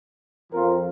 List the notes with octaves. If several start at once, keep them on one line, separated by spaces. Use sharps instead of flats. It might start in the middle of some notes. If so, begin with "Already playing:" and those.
F2 F3 C4 F4 A#4